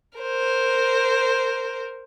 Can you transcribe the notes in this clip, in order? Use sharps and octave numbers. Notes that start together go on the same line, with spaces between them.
A#4 C5